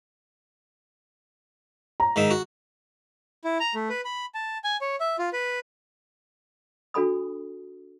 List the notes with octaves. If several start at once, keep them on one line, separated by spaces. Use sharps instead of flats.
A#5
G#2 D#3 E5
F#4
E4
A#5
A3
B4
B5
A5
G#5
C#5
E5
F4
B4
D4 F#4 A4 G#5 B5 D#6